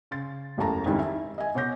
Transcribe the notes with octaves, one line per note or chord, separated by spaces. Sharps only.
C#3 C6 A6
E1 A1 F#2 A4 A5 A#5
F2 G#2 D#3 G3 C#4 E4
E5
D#5 E5 G#5
B2 C#5 D6 G6 A#6